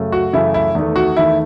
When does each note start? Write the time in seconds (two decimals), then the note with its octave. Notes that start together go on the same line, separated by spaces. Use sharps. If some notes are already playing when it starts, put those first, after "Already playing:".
Already playing: F#2 C#3 A3
0.12 F#4
0.33 F#2 C#3 E3 A3 E4
0.54 E4
0.75 E2 D#3 A3
0.96 F#4
1.16 E2 D#3 A3 E4